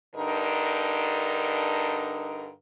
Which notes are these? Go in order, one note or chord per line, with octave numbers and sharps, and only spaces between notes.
G2 D3 D#4 A#4